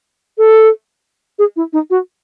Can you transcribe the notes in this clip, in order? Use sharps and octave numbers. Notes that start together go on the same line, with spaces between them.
A4
G#4
E4
D#4
F#4